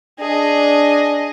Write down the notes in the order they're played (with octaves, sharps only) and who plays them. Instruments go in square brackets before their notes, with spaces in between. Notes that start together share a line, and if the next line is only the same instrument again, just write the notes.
[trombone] D4 [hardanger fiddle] G#4 D#5